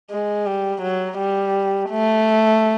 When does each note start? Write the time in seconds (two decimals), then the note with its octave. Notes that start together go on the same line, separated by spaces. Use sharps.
0.11 G#3
0.46 G3
0.82 F#3
1.18 G3
1.89 A3